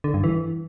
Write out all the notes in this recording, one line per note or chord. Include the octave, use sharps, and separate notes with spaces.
D3
G2
E3